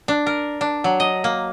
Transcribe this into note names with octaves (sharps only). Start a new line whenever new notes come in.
D4
A#4
D4
F#3
D#5
A#3